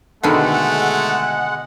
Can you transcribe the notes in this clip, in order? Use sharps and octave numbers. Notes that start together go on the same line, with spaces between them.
B2 D3 D#3 G#3 A3 F#5